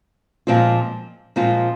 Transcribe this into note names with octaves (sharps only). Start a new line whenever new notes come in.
A#2 F3 G#3 C4 F4
A#2 F3 G#3 C4 F4